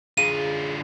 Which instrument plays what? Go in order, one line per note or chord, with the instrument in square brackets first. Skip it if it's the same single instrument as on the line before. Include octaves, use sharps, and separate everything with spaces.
[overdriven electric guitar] D3 F4 [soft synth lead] G#4 [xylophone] D#7